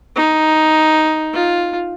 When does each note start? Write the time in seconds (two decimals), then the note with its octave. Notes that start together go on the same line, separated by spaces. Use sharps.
0.16 D#4
1.34 F4